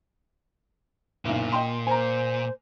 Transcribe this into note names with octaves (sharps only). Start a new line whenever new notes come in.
F#1 B1 A#2
D#5 G5 C6
C5 G#5 A#5